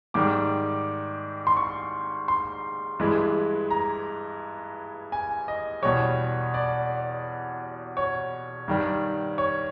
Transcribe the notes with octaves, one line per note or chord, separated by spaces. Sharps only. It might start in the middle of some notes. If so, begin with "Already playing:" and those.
G#2 D#3 G3 D6
C6
C#6
C6
G2 E3 G#3
A#5
G#5
D#5
E2 B2 G3 C#5
D5
C#5
G2 D#3 G3
C#5